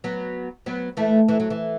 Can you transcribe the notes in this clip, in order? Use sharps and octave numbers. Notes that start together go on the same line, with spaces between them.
F#3 B3
F#3 B3
E3 A3
E3
F#3
E3